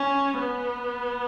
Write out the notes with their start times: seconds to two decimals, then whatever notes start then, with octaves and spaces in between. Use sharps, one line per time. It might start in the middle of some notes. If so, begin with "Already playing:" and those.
Already playing: C#4
0.39 B3